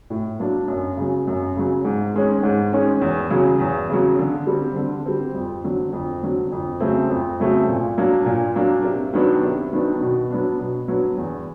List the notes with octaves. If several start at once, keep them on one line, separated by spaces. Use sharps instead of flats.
A2
F#3 A#3 D4
F#2
C#3 F#3
F#2
C#3 F#3
G#2
D#3 G#3 C#4
G#2
D#3 G#3 C#4
E2
C#3 F#3
E2
C#3 F#3
D3
G3 C4
D3
G3 C4
F2
D3 F#3
F2
D3 F#3
F2
C#3 F#3 A3 C4
F2
C#3 F#3 A3 C4
A#2
F#3 A#3 D4
A#2
F#3 A#3 D4
C3
D#3 F#3 B3 D4
C3
D#3 F#3 B3 D4
B2
F#3 B3 D4
B2
F#3 B3 D4
E2